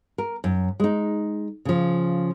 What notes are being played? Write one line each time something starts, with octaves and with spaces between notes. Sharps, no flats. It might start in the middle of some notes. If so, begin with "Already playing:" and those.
A#4
F#2
G#3 D#4
C#3 F3